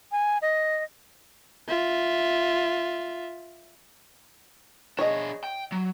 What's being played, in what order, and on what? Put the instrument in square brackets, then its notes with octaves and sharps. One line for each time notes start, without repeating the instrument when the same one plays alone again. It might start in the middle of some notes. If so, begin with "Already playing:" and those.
[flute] G#5
D#5
[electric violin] F4 E5
[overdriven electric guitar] D4 G#4 [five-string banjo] C#5 D#5
[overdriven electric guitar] G5
F#3